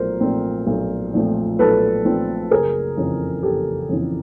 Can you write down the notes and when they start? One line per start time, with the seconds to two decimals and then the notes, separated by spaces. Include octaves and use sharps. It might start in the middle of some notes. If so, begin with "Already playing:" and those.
Already playing: B1 A#2 F3 A3 A#4 C5
0.20 A#2 F3 A3 C4
0.67 B1
1.14 A#2 F3 A3 C4
1.59 B1 A4 B4
2.05 A#2 F3 A3 C4
2.51 F#1 G#4 A#4
2.97 F2 C#3 E3
3.43 F#1 G4 A4
3.89 F2 C#3 E3